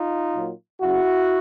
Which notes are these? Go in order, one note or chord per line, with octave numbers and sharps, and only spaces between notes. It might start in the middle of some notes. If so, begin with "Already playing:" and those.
Already playing: D#4 F4
A#2 F#3 A#3
F#2 C#3 F#3 E4 F#4